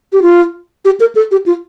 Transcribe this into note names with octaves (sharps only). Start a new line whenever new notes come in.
G4
F4
G4
A#4
A4
G4
F4